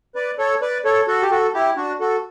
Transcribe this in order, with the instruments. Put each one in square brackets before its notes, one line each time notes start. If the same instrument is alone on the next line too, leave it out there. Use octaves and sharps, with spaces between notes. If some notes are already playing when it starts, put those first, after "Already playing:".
[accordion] B4 D5
A4 C#5
B4 D5
A4 C#5
F#4 A4
G4
F#4 A4
E4 G4
D4 F#4
F#4 A4